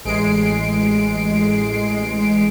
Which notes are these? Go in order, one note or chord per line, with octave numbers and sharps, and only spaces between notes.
A1 G#3 C7 D7